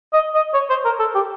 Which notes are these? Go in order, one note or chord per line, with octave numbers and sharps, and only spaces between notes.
D#5
D#5
C#5
C5
A#4
A4
G4